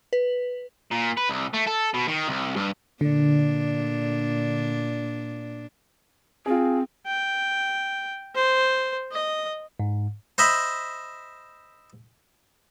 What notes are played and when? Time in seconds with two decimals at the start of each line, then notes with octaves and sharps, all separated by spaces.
0.13 B4
0.92 A#2
1.18 B4
1.30 C2
1.54 A3
1.67 A4
1.94 B2
2.08 D#3
2.28 C2
2.56 G2
3.01 A#2 D3 D4
6.46 C4 F4 G#4
7.07 G5
8.35 C5
9.12 D#5
9.80 G#2
10.38 C5 D#5 E5 B5